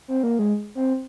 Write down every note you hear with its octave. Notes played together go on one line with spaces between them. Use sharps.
C4
A#3
G#3
C4